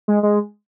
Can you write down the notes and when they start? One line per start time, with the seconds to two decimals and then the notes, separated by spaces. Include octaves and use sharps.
0.08 G#3
0.23 G#3